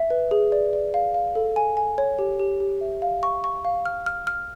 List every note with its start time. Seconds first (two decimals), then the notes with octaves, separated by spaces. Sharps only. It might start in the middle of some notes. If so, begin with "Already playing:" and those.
Already playing: E5
0.10 B4
0.31 G#4
0.52 D5
0.73 D5
0.94 F5
1.14 F5
1.35 A4
1.56 G#5
1.77 G#5
1.98 C#5
2.19 G4
2.39 G4
2.60 G4
2.81 E5
3.02 F5
3.23 C#6
3.44 C#6
3.65 F5
3.86 F6
4.06 F6
4.27 F6